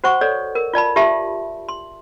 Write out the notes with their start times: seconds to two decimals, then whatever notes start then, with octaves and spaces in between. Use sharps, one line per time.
0.04 F#4 C5 F#5 C#6
0.21 A4 C#5 D5
0.55 A#4
0.73 F4 D5 A5 B5
0.96 F4 G4 E5 A5 C6
1.69 C6